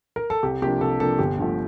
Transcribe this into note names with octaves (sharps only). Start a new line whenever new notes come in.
A#4
A4
C2 G4
C3 F3 A#3 D4 G4
C2 A4
C3 F3 A#3 D4 A4
G1 G4
G2 D3 F3 A3